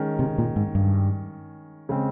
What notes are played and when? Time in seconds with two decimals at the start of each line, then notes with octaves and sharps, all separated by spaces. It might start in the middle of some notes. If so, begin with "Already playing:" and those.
Already playing: D#3 G#3 C#4
0.19 C3
0.38 A#2
0.56 G#2
0.75 G2
1.89 C#3 G#3 C4